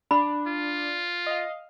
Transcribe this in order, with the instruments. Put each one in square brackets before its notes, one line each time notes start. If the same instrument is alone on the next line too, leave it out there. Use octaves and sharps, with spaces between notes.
[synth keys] D4 [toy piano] B5
[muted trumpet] F4
[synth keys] D#5 F5